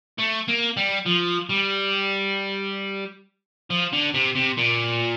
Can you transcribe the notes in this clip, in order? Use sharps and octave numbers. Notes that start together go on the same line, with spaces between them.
A3
A#3
G3
F3
G3
F3
D3
C3
C3
A#2